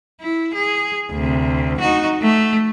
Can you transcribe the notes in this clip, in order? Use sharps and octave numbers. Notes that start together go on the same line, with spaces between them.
E4
G#4
D2 C3
D#4 F#4
A3